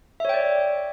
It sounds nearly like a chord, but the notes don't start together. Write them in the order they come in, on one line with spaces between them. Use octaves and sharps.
E5 C#5 G5 D5